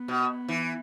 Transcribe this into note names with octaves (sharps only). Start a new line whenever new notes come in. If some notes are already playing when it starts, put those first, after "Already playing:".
Already playing: B3
B2
E3